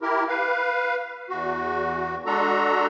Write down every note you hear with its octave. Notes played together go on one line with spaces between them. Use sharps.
E4 G4 A#4
B4 F5
E2 F#4
G#3 D4 F#4 A4 A#5